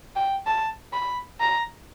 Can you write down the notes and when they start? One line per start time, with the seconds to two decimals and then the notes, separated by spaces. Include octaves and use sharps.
0.16 G5
0.47 A5
0.93 B5
1.41 A#5